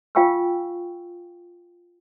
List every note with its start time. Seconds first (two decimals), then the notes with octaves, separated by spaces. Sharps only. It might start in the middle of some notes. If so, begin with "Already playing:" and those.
0.15 F4 F5 G5 G#5 C#6 E6